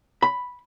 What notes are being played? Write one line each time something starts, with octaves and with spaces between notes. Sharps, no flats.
B5